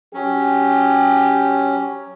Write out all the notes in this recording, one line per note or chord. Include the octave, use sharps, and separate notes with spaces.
F#3 C#4 G4